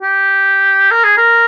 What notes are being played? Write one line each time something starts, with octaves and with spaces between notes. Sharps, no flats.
G4
A#4
G#4
A#4